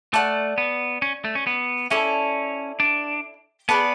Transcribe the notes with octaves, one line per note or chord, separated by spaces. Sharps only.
A3 D5 F#5 A5 D6
B3
C#4
A3
C#4
B3
C#4 E4 A4 D5 A5
D4
B3 G#4 B4 D5 A5